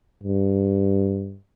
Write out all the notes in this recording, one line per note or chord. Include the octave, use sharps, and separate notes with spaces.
G2